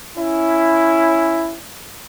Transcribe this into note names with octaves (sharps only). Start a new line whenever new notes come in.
C#4 E4